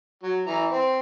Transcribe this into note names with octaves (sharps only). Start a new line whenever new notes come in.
F#3
E3 A#5
C4